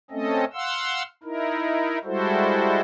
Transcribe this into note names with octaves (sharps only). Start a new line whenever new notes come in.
A3 C4 C#4 A4 D#5
F5 F#5 C6 E6
D#4 E4 A#4
G3 G#3 E4 F#4 A4 C5